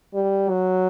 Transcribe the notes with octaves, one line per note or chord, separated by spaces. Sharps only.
G3
F#3